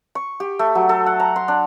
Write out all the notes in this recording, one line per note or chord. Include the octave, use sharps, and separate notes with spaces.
C#6
G4
A3
F#3
A4
F#5
A#5
C6
D4